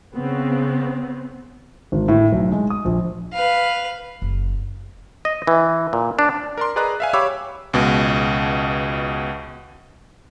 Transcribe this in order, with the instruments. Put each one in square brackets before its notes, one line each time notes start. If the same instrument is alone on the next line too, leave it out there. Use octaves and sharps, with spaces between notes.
[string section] C#3 B3 C4
[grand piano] G#1
A2
B1
G#3
D#6
A#1
[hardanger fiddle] B4 F5
[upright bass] F#1
[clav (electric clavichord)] D#5
E3
A#2
D4
[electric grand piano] A#4 D5 C6
G#4 B4 D5 D#5 A#5 F#6
E5 F5 G#5
G4 C#5 F5 B5 D6 E6
C#2 B2